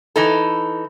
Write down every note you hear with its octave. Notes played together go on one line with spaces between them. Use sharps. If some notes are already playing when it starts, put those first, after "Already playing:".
E3 D#4 A4